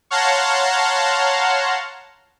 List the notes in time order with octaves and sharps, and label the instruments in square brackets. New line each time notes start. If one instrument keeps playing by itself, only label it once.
[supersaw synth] C#5 F5 F#5 A5 A#5 C6